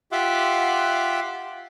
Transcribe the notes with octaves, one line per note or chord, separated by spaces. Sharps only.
F4 G4 E5 F#5 C6 D6